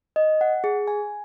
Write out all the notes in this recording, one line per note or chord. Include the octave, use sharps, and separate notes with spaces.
D#5
F#5
G#4
G#5